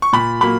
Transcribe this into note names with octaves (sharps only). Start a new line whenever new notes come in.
C#6
A#2 B5
F#3 A#3 B5